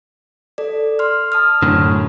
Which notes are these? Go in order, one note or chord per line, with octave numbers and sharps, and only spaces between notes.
A4 D5
C6 F6
A5 D#6 F6
F#2 A2 D3